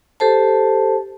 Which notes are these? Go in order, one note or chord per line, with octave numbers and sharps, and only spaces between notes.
G4 A4 C5 A5